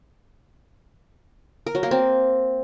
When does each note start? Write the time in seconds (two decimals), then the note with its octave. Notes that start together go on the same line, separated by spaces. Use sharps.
1.67 A#4
1.75 F#3
1.83 A#3
1.91 C4